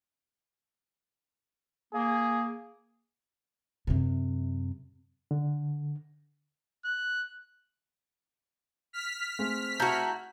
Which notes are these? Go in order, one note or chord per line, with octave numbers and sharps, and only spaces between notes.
A#3 G#4
F#2 C3
D3
F#6
F6 B6
A3 C4 G#4
E4 F#4 A5 A#5 G6